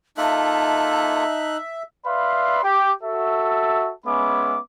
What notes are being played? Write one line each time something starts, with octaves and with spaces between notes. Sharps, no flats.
A#3 D#4 F4 A4 E5 A5 F#6
B4 D5 E5 F5 B5 C6
G4
F#4 A4 E5
G#3 B3 C#4 E5 B5 D6